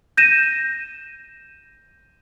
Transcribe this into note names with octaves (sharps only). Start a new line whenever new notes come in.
G6 A#6 D#7 E7